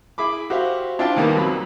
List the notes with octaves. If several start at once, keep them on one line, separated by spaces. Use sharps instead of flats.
E4 G#4 B5 D6
F#4 G4 C5 E5 F5
D4 E4 F4 C5 G5 A5
D#2 D#3 G3 A#3 B3
F2 F#3 B5